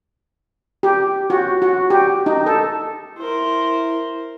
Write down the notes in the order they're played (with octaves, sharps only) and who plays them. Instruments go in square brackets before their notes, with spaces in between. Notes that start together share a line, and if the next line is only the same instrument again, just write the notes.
[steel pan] G4
F#4
F#4
G4
D#4
A4
[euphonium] E4 [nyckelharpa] A#4 C5